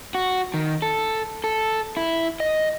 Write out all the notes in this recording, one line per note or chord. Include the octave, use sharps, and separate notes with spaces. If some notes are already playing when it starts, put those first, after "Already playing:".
F#4
D#3
A4
A4
E4
D#5